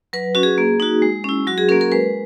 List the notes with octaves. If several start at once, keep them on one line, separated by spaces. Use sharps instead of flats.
F#3 B4
C#4 F#4
G#4
A#3
D#4 F#4
G#3
C#4 E4
F#3 F#4
G#4
A#3 C#4 A#4
A#4
G#3 B4